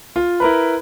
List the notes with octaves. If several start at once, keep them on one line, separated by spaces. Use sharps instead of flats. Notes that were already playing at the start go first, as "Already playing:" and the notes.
F4
E4 A#4 B4